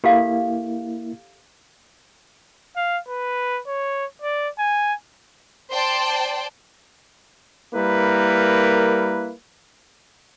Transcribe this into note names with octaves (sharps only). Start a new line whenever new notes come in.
A#3 E4 G4 A4 F5
F5
B4
C#5
D5
G#5
C5 D5 G5 A5 C6
G3 A#3 E4 A#4 B4